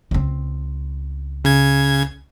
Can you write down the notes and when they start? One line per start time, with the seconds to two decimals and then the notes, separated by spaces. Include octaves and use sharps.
0.11 C#2 C4
1.45 C#3 G#6